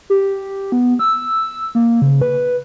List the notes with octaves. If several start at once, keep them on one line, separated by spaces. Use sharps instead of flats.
G4
B3
E6
A#3
C#3
B4